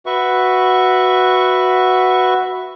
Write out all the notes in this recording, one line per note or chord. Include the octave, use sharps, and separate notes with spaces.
F#4 B4 E5 C#6